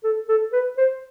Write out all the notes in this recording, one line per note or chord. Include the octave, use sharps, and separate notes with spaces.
A4
A4
B4
C5